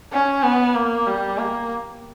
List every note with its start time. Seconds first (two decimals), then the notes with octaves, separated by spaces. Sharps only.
0.13 C#4
0.43 B3
0.74 A#3
1.07 G3
1.38 A#3